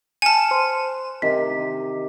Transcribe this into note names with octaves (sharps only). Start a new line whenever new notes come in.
G#5 A5 F6 C#7
C5 C6
C3 D#3 G4 B6